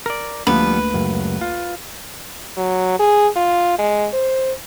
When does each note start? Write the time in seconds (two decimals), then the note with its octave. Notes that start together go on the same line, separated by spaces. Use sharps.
0.06 A#4 D5
0.47 D2 F3 G3 A#3 B3 B4
0.94 C#2 F#2
1.41 F4
2.57 F#3
2.99 G#4
3.36 F4
3.79 G#3
4.14 C5